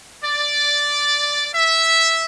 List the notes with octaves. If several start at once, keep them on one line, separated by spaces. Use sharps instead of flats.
D5
E5